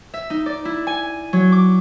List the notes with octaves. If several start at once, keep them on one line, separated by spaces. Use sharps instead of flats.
E5
D#4
D5
E4
G#5
F#3
D6